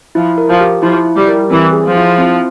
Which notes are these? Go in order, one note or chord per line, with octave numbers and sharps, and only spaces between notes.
F3 E4
A#4
F3
G4
F3 E4
E4
G3
A#4
E3 C4
G#4
F3
E4
C4